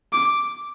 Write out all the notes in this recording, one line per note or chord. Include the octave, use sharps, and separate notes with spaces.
D6